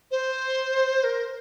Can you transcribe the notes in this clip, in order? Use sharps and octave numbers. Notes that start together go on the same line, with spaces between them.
C5
A#4